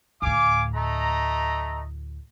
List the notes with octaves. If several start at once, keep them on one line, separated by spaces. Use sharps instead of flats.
D2 A2 F5 G#5 D6
A3 D#5 A#5